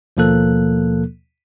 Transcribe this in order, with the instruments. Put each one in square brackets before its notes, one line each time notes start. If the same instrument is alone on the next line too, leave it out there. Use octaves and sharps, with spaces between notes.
[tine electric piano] D#2 B2 F3 A#3 A4 F#6